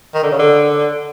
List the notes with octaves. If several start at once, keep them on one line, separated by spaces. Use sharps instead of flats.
D#3
D3
C#3
D3